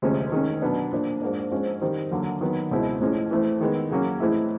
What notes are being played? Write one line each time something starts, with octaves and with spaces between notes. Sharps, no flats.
D2 C3 F3 G#3 C#4
D#3 G#3 C#4
B2 F#3 B3 D4
A#2 F3 A#3 D4
G#2 F3 A#3 D4
G#2 F3 G#3 C#4
D#3 G3 C4
D#2 D3 F#3 A#3
D#3 F#3 B3
C#2 B2 G#3 C4 E4
A2 F3 G#3 C#4
E3 A3 C4
D#3 G#3 B3
C#3 F#3 A#3 C#4
A2 E3 G#3 C4 E4